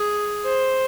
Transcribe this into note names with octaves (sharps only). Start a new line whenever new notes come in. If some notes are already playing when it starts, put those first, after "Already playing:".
Already playing: G#4
C5